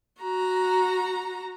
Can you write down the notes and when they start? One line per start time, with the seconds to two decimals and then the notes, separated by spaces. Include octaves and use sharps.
0.21 F#4 A#5